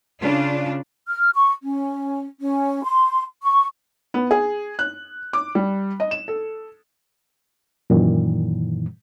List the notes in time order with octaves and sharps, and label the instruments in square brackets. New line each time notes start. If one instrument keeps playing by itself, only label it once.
[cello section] C#3 D4 F4
[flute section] F6
C#6
C#4
C#4
C6
C#6
[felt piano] B3
G#4
F#6
D6
G3
D#5
E7
A4
[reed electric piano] F#2 A#2 D#3 E3